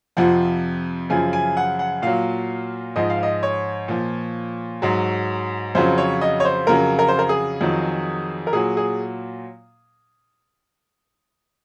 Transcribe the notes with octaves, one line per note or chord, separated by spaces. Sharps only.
F2 C3 F3 F#5
F#2 C#3 F3 G#5
G#5
F#5
F#5
A#2 F#3 F5
G#2 F3 D#5
F5
D#5
C#5
A#2 F3
G#2 F#3
F2 C#3 F#3 C5
C#5
D#5
C#5
C5
F2 C#3 F#3 A#4
A#4
C5
A#4
G#4
F2 D#3 F#3
A#4
A#2 F#3 G#4
G#4